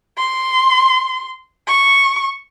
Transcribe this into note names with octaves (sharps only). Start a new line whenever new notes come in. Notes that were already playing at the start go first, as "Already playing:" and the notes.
C6
C#6